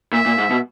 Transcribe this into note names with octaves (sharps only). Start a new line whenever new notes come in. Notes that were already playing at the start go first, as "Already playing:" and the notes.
A#2 E5
A#2
G#2
B2